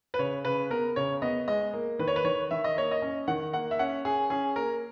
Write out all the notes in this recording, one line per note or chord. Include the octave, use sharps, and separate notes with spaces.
B4
C#3 C#5
C#3 B4
B3 A#4
C#3 C#5
B3 D#5
G#3 D#5
A#3
D#3 B4
C#5
B4
D#3 C#5
D#3 E5
D#5
A#3 C#5
D#5
C#4
D#3 F#5
A#3 F#5
E5
C#4 F#5
C#4 G#4
C#4 G#4
A#3 A#4